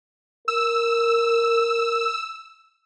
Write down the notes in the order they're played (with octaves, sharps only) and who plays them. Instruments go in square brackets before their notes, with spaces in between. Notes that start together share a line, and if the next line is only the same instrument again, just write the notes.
[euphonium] A#4 [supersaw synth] E6